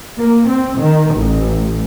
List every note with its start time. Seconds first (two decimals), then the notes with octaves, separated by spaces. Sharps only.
0.18 A#3
0.47 C4
0.79 D#3
1.15 A1